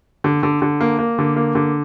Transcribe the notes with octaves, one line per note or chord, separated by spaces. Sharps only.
D3
D3
D3
A#3
A#3
D3
A#3
D3